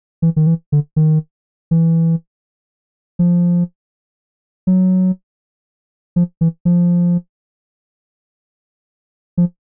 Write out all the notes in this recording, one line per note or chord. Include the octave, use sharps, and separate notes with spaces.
E3
D#3
E3
D3
D#3
E3
F3
F#3
F3
E3
F3
F3